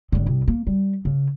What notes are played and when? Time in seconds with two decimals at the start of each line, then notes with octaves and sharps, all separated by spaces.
0.12 G#1 D3
0.26 C2
0.48 A#3
0.67 G3
1.05 C#3